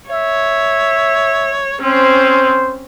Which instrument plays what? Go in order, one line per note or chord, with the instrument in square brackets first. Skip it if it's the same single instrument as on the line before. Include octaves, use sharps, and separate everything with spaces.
[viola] C#5 [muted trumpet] E5
[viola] C4 C#4 [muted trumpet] C5